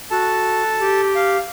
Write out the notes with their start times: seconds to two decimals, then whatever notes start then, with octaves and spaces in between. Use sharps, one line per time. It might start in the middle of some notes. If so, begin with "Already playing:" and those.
0.11 F#4 A4 A5
0.80 G4
1.15 F5